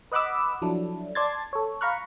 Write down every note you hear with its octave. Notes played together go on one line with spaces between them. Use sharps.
B4 D#5 F#5 B5 D6 E6
F3 F#3 D4 E4 A4
D5 A5 C6 G#6 A6
A4 C#5
F5 A#5 B5 C#6 F6 F#6